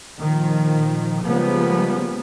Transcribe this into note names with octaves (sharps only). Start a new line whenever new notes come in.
A#2 D#3 F3
C#3 F3 G3 G#3 A#3 B3